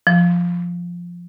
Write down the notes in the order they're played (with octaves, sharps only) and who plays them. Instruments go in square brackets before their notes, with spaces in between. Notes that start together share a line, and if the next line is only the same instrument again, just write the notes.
[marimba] F3